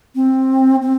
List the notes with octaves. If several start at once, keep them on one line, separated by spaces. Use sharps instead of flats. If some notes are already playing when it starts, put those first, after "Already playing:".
C4
C4